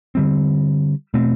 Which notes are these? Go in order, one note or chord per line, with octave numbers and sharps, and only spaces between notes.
D3 G3 C4
B2 A3 C4